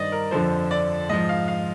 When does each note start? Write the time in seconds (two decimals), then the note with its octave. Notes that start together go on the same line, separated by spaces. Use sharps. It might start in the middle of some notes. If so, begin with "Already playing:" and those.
Already playing: G2 D#3 C5 D5 D#5
0.12 A#4
0.31 F2 D3 F3 C5
0.71 D5
1.09 G#2 F3 D#5
1.29 F5
1.48 F5